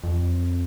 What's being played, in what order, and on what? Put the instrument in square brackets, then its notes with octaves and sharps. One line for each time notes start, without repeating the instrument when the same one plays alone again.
[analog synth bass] F2